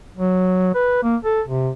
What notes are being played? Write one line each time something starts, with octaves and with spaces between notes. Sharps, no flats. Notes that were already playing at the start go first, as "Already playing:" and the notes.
F#3
B4
A#3
A4
C3